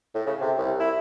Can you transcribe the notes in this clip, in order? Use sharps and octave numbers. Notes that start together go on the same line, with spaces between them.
A2
C#3
C3
C2
E4